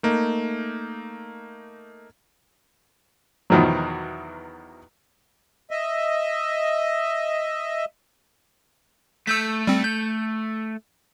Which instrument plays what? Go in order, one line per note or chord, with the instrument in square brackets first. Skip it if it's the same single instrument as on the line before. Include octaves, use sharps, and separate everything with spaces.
[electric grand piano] A3 A#3 D#4
[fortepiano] E2 B2 D#3 F3 F#3
[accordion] D#5 E5
[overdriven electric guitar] A3 [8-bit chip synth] E6 G6 B6
[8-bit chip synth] G3 C4
G6